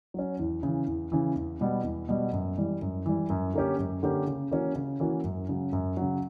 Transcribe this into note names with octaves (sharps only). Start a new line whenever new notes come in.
F#3 C#4
E2
C#3 E3
E2
C#3 E3
E2
B2 G3 B3
E2
B2 G3 B3
F#2
E3 G3
F#2
E3 G3
F#2
D3 A#3 C#4 G4
F#2
D3 A#3 C#4 G4
C#3
E3 A#3 C#4 F#4
C#3
E3 A#3 C#4 F#4
F#2
C#3 F#3
F#2
C#3 F#3